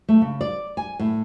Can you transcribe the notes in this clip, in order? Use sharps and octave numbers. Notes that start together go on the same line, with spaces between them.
A3
C#3
D5
G#5
A2